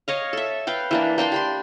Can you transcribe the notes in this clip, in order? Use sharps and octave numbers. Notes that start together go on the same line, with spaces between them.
C#5 D#5 F5
A4 E5
B4 F5 G5
E3 A#3 D4
A#3 D4 G5 C6
G4 B5 C6